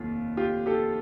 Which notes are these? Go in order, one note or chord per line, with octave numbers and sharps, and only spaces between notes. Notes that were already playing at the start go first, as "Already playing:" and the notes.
Already playing: F1 D#2 F4
F4 G4
G4 A4